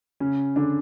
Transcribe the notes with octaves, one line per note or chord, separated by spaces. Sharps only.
C#3 C#4
D3 D4